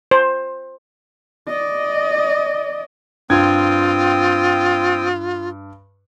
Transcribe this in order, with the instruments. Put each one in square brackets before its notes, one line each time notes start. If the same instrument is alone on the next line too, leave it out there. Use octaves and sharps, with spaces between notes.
[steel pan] C5
[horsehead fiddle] D5 D#5
[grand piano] G2 G#6 [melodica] C4 G5 D#6 [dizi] F4